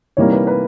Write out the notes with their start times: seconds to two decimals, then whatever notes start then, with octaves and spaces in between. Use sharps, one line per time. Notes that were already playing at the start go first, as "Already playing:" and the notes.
0.17 C3 E3 G3 A#3 D#4 C#5
0.32 B4
0.47 B4